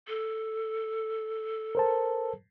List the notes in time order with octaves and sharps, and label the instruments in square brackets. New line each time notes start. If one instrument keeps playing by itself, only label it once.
[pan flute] A4
[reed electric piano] A#4 C5 A5